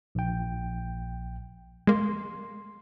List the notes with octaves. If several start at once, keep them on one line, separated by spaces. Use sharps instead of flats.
A#1 G5
G#3 A#3 C6